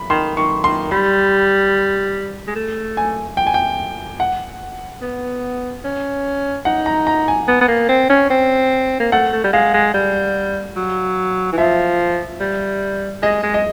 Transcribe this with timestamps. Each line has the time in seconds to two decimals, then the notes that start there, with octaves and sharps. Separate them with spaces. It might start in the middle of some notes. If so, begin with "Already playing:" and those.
Already playing: B5
0.10 D#3 C6
0.37 D#3 C#6
0.64 D#3 C6
0.91 G3 B5
2.47 G#3
2.55 A3
2.97 G#5
3.37 G5
3.47 G#5
3.54 G5
4.20 F#5
5.02 B3
5.84 C#4
6.65 D#4 F#5
6.86 A#5
7.07 A#5
7.28 G#5
7.48 B3
7.61 B3
7.68 A#3
7.89 C4
8.10 C#4
8.30 C4
9.00 A#3
9.12 A3 F#5
9.33 A3
9.44 G3
9.53 G#3 F5
9.74 G#3
9.94 G3
10.76 F#3
11.52 E3
11.58 F3 E5
12.40 G3
13.22 G#3 D#5
13.43 G#3
13.54 D#5